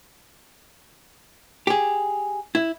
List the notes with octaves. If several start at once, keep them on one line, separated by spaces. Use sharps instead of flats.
G4 G#4
E4